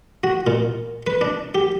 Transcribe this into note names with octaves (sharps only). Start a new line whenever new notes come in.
F#4
A#2
B4
D4
G4